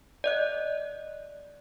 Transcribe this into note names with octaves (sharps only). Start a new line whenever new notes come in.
D5 D#5 F#6